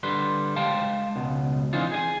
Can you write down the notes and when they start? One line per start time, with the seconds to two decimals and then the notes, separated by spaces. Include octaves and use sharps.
0.03 D3 G3 B4 C6
0.56 G#3 F5 G5 A5 C6
1.16 C#2 B2
1.73 E3 C4 D4 D#4 F4
1.92 G#4 D#5 G#5